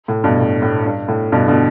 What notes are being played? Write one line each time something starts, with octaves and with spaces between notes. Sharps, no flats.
A2
G2 B2
A2
A2
G2
A2
G2 B2
B2 D3